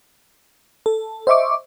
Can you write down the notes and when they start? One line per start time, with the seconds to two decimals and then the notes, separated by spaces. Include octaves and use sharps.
0.86 A4
1.27 C5 D#5 E5 C#6 D6